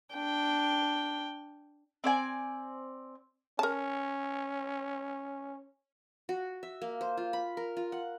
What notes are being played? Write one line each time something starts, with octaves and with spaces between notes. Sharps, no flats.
D4 G5
C4 D5 G#5
C#4 A#4 A5
F#4
E5
A#3
C5
F4
B5
A#4
F4
F#5